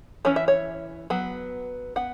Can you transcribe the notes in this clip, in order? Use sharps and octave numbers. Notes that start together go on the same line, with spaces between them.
E3 C#4 C#5
E5
C#5
F#3 B3
B3 F#5